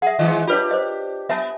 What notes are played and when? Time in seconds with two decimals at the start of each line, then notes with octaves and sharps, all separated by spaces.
0.02 G#4 E5 F#5
0.19 D#3 E3 G#3 D#5
0.47 D4 F4 G4 B4 C#5
0.71 C5 D#5
1.29 B3 E5 G#5 A5